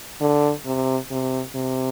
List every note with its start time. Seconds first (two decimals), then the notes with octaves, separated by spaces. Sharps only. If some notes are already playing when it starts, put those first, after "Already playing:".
0.20 D3
0.66 C3
1.11 C3
1.55 C3